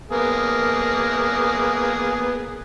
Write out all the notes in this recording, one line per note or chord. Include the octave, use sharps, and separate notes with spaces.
A#3 B3 G#4